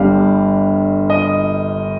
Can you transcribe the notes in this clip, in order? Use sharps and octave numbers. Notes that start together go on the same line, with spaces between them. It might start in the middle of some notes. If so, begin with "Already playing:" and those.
Already playing: G1 G2 G3 F5
D#5